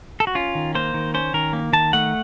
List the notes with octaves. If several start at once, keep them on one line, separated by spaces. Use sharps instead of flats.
A4
F#4
C#4 F4
D#3
A#3 C5
D#3
C#4 C5
D#3 A#4
A#3
D#3 A5
A3 F#5